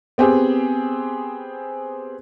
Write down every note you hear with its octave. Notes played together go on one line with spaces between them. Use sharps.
B3 C4 G4 G#4